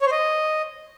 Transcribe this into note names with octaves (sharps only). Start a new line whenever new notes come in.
C#5
C5
D#5